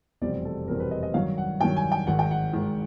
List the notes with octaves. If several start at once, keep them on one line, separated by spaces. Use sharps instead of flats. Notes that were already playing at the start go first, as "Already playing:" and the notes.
F1 E2 B2 G3 C4 D5
A4
F1 E2 B2 G3 C4 A#4
B4
D#5
D#5
G2 D#3 F#3 F5
F#5
G2 D#3 F#3 G5
G#5
G5
G#1 G#2 D#3 F#5
G5
F#5
G#1 G#2 D#3